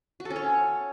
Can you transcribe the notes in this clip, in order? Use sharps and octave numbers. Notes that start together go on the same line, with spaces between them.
F#4
A4
C#4
C#5